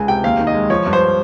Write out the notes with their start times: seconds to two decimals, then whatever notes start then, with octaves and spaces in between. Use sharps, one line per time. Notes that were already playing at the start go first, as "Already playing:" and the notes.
Already playing: C#2 G#3 G#5
0.08 C3 G5
0.24 D#2 F5
0.39 D#3
0.47 D#5
0.54 G#3
0.70 F3 C#5
0.86 G2
0.93 C5